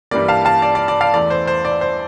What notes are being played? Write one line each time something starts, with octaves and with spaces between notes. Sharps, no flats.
G2 E3 G3 A#3 D5
F5 A5
F5 A5
D5
D5
D5
D5 F5
E2 E3 A3 D5
C5
C5
D5
C5